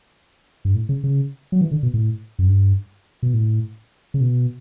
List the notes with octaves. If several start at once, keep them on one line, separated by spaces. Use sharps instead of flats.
G2
A2
C#3
C#3
F#3
E3
D3
B2
A2
F#2
G2
B2
A2
C#3
B2